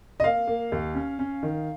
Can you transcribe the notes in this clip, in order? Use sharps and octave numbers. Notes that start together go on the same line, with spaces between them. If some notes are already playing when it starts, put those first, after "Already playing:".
D#5
A#3 F5
A#3
D#2
C#4
C#4
D#3